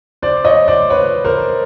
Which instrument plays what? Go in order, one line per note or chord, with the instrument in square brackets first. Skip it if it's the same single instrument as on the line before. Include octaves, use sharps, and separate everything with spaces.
[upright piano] C5 D5
C#5 D#5
C5 D5
B4 C#5
A#4 C5